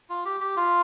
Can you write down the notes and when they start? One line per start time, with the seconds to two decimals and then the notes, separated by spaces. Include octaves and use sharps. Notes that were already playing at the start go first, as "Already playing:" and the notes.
0.10 F4
0.25 G4
0.40 G4
0.57 F4